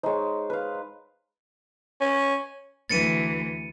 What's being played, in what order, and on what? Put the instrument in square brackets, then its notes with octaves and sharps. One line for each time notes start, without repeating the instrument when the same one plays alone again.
[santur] G#3 D#4 [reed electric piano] C5 C#5
[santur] B4 F5
[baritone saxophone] C#4
[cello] D2 E3 [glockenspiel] A6 C#7 D#7